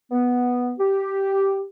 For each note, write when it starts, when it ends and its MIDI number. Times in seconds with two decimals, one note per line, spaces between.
0.11 0.73 59
0.79 1.63 67